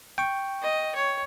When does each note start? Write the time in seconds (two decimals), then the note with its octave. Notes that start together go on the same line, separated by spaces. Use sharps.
0.18 G5 C#6
0.62 D#5
0.95 C#5